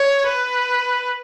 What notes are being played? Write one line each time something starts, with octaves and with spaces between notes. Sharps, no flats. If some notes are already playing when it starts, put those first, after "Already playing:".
Already playing: C#5
B4